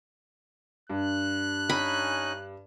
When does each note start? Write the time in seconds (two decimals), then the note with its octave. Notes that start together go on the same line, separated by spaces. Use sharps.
0.90 G2 F#6
1.70 C#4 D#4 G#5 B5